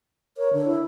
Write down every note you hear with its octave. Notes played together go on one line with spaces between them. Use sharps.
A#4 C#5
D3
E4